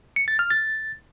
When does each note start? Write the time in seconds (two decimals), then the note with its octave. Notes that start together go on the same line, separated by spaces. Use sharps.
0.16 C#7
0.28 A6
0.39 F6
0.50 A6